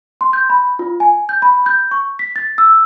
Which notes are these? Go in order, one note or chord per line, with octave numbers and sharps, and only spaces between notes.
C6
G6
B5
F4
G#5
G6
B5
G6
C#6
B6
A6
E6